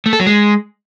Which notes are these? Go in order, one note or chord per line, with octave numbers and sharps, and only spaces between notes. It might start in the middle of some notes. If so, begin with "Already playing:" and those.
A3
A4
F#3
G#3